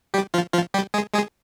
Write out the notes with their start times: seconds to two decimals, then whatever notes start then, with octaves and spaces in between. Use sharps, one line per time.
0.14 G3 G4
0.34 F3 F4
0.54 F3 F4
0.74 G3 G4
0.94 G#3 G#4
1.14 G#3 G#4